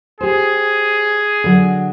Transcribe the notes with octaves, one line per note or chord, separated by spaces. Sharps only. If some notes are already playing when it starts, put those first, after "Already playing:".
G4 G#4 C5
D3 F#3